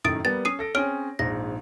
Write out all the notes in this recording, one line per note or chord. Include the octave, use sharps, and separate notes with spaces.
F#2 A2 D#3 D#6 A6 D7
G3 A#3 B3 A6
C#4 D#6 C7 D#7
A4 A#6 D7
C4 C#4 G#4 C#5 F6 D7
A#1 G#2 A#6